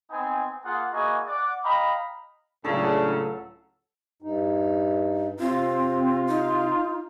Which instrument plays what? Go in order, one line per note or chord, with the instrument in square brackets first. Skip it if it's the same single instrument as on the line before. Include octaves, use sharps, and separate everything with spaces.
[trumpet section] B3 C4 D#4 G#5
A#3 F4 G#4 F#5
A#3 E4 F#4 G#4 D#5 G#5
D5 F#5 D6
D#5 F5 G5 A#5 B5
[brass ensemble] C#2 A2 [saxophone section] C#3 [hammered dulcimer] F#3 A4 [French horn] D4
[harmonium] G2 D#4
[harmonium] C3 [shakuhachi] C4 [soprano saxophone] F4
[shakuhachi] D#4